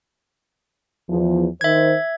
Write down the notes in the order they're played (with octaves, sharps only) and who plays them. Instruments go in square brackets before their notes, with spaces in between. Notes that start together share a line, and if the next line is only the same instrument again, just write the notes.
[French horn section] E2 F3
[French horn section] D#3 C5 [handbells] E5 G#6